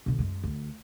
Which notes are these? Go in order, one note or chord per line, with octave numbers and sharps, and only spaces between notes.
B2 D3
F#2 G#3
D2